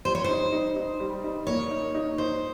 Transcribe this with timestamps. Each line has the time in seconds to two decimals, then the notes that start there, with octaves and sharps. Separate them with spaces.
0.05 G3 C5
0.15 C#5
0.24 D#4 C5
0.52 D#4
0.76 D#4
1.00 G3
1.24 D#4
1.47 A#3 C#5
1.71 D#4
1.95 D#4
2.18 D#4 C5